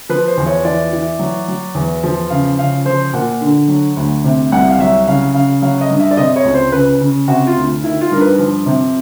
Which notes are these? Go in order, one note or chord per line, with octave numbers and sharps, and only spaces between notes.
F3 B4
C5
E2
C#5
E3 D5
E3
F#3
F#3
E2
F3
C#3 F5
C#3 F5
F3 C5
A#2 F#5
D3
F#3
D2
C3
C2 F#5
F5
F#3 E5
C#3 F5
C#3 F5
F#3 F5
D#5
G2
E5
D5
C3 D#5
C#5
C#2
C5
C#3 B4
C#3
C3 F#4
F4
D2
D#3 E4
F4
G2 A#4
B4
F3
C3